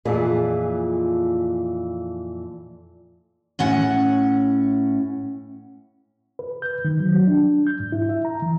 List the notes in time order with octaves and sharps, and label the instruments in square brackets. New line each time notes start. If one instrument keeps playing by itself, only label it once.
[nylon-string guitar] F2 A#2 E3 G#4
[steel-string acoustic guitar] A2 C#4 F#5
[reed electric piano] B4
G6
D#3
F#3
F#3
D4
G6
G#2
E4
E5
A#5
E3